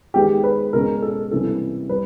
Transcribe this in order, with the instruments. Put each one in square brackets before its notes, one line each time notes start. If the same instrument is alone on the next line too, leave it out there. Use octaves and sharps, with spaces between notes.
[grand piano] D#3 G#3 B3 [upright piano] G4
[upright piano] B4
[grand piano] B2 G#3 C#4 [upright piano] A#4
[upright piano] A4
[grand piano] C3 E3 G3 A#3 C#4 [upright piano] A4
[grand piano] G3 [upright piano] B4